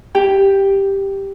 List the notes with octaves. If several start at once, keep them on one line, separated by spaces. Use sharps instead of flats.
G4 G5